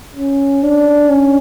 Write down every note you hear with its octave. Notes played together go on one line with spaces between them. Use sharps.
C#4
D4
C#4